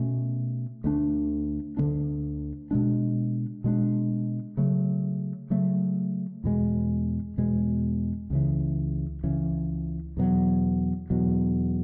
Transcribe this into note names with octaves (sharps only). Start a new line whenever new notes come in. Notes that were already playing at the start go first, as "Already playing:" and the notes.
Already playing: B2 A3 C#4
D2 D3 A3 D4
D2 D3 A3 D4
B2 G#3 D4
B2 G#3 D4
C#3 F#3 A3
C#3 F#3 A3
E2 B2 G#3
E2 B2 G#3
C#2 C#3 E3
C#2 C#3 E3
E2 B2 F#3
E2 B2 F#3